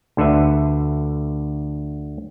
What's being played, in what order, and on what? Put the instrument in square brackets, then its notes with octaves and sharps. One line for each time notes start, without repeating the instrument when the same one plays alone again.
[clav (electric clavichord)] D2 D3 A4 B4 E5